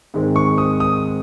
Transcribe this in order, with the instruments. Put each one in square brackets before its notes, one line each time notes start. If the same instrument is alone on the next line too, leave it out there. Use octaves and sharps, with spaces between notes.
[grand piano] G#2 D#3 G#3 C4
C#6
D#6
D#6